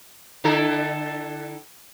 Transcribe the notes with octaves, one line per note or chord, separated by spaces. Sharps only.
D3 E4 A4